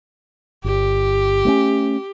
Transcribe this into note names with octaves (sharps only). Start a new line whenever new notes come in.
G1 G4
A3 C4 C#4